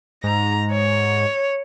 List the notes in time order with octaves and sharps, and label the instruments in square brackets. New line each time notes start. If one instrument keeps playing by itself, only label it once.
[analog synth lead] G#2 [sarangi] A#5
[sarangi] C#5